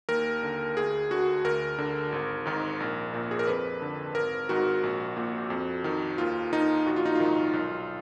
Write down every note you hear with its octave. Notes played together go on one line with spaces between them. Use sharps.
D#2 A#4
D3
D2 G#4
D3 F#4
D2 A#4
D3
G#1
G#2 D#3
A#1
A#2
G#4
A#4
F2 B4
D3
G#1 A#4
G#2 D#3 F#4
A#1
A#2
F2
D#3
D#2 F4
D#3 D#4
A#1 F#4
F4
D#4
G#2 D#3 F4
B1